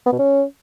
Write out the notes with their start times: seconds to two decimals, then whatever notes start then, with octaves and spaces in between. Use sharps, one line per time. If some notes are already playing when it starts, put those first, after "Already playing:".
0.06 B3
0.13 B2
0.19 C#4